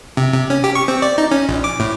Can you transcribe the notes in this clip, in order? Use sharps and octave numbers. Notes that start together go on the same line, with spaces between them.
C3
C3
C#4
G4
C#6
C4
D5
D#4
C#4
A#1
D6
A2